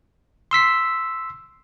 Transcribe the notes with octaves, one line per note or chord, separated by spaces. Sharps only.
C6 E6 B6 C7